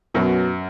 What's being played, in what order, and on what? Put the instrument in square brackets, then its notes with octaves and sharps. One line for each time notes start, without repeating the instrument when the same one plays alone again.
[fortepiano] F#2 [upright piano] B2 F#3 B3 F#4 B4